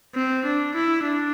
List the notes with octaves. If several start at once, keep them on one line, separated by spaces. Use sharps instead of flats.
C4
D4
E4
D4